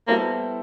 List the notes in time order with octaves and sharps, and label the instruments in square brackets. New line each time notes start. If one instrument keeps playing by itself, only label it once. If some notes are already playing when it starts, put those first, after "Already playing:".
[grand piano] G3 B3 E4 A4 C5 [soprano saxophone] A#3